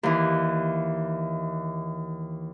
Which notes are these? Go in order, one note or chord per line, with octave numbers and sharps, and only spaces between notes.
D#2 E3